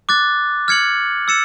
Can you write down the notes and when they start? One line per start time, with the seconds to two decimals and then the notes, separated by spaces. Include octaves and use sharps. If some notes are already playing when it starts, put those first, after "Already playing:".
0.09 D6 F#6 A6
0.68 F6 G#6 C#7 F#7
1.28 E6 A6 C#7 E7